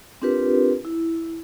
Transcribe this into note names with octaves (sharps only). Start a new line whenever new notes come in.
C4 D4 F4 G4 A#4 B4
E4